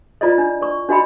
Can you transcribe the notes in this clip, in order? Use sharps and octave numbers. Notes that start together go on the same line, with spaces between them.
E4 F4 D5 D#5
D4
D5 C#6
D4 F#4 D#5 G5 B5